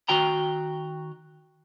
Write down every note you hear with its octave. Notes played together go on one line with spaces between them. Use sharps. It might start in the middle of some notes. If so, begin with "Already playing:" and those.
D#3 F#4 G5 A#5